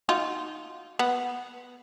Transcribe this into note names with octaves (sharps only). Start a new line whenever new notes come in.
D#4 F4 F#4
B3